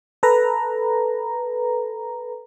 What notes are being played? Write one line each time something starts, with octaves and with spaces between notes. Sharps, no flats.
A4 B4 A#5